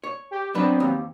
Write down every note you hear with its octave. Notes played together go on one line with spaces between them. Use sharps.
C#5
G4
F#3 B3 C4 D4 B4
D#2